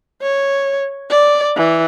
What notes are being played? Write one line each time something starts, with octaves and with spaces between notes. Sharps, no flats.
C#5
D5
E3